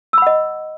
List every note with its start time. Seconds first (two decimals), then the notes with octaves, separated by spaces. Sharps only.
0.13 E6
0.18 B5
0.22 F#5
0.27 D#5